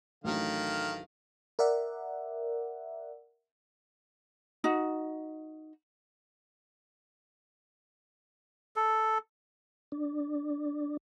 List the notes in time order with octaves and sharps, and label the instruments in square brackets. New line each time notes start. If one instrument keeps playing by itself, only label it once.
[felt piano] A1 F#3 D4 [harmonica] D#3 A4 F5
[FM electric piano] A#4 D5 E5 F#5
[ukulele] D#4 F#4
[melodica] A4
[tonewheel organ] D4